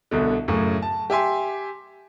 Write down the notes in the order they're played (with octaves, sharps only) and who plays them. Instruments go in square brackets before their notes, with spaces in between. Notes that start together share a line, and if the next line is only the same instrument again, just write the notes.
[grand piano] C2 B2 D3
F#2 A2 C#3
A5
G4 E5 G#5 C6